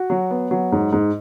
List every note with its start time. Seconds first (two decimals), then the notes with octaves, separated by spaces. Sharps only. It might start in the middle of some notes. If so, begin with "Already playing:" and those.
Already playing: F#4
0.10 F#3
0.30 B3
0.51 F#3
0.72 G#2
0.92 G#2